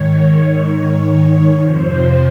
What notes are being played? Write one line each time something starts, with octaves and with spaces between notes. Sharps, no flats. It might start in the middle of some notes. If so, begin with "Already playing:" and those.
Already playing: G#2 D#3 C#5
F2 C3 F3 C5